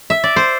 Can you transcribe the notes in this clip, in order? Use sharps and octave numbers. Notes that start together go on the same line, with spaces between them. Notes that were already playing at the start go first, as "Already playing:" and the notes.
E5
D5
C5